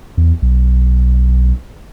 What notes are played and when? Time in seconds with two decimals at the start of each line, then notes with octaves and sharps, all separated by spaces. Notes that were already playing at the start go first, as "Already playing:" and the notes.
0.17 E2
0.42 B1